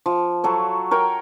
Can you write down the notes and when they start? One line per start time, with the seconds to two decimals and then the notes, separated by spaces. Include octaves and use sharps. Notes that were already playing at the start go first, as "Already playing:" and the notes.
0.06 F3
0.44 F#3 A4 C#5
0.91 A#4 C#5 G5